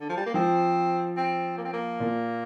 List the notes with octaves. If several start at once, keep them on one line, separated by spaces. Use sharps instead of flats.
D3
F3
G3
A#3
F3 C4
C4
A#3
C4
A#3
A#2